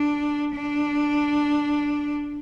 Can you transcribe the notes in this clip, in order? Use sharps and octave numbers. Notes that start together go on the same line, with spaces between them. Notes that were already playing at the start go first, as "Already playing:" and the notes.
Already playing: D4
D4